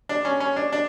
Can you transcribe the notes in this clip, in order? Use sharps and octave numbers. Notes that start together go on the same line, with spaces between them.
D4
C#4
C#4
D4
D4